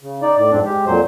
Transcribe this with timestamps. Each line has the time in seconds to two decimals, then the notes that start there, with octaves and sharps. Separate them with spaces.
0.03 C#3
0.22 D#4 D5
0.36 A2 D5
0.51 F2 G#2 C4 D4
0.64 G#3 G4
0.86 F2 A#2 F#3 C5